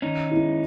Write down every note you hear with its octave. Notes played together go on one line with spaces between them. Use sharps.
D#3 C#4 D#4
G#3 B3 E4